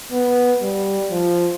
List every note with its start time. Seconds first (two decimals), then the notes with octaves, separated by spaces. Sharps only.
0.12 B3
0.62 G3
1.11 F3